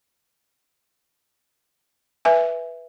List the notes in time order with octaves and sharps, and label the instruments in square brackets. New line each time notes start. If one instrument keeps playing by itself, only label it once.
[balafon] B4 E5 G#5